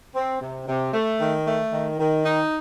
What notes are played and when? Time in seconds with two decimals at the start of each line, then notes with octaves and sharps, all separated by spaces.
0.16 C4
0.42 C3
0.68 C3
0.93 A3
1.21 D#3
1.47 A3
1.73 D#3
2.00 D#3
2.25 D#4